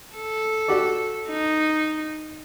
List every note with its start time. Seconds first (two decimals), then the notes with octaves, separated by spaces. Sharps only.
0.15 A4
0.68 F#4 G4 D5
1.29 D#4